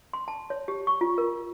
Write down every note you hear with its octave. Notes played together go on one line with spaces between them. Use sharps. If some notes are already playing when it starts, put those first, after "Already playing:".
C6
A5
C#5
G4
C#6
F4
A#4